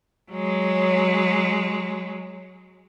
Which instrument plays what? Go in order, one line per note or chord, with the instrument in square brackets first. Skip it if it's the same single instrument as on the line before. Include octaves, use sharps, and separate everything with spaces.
[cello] F#3 G#3